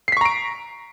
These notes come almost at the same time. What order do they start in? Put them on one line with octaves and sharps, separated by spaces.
C7 B6 C#6 A#5 D7